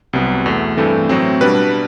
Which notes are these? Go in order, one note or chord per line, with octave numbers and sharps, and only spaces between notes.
C2 C3 F#3 B3
E2 B2 A3
G2 E3 A3 C4 A4
A2 F#3 C4
B2 G3 D4 B4